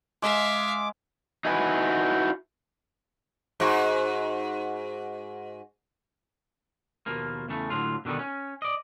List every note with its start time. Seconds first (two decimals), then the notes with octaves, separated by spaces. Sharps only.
0.22 G#3 E5 F5 D6
1.45 D#4 E4 F#4 B4 G#5
3.60 G#2 F#4
7.06 D#2 B2 F3 A#3
7.49 E2 C#3 A3
7.70 A2 D3 F#3 F4
8.05 B2 D3 D#3 G3 B3
8.19 C#4
8.62 D5 D#5